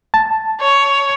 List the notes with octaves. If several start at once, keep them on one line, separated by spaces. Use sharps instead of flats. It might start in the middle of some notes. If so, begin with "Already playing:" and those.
A5
C#5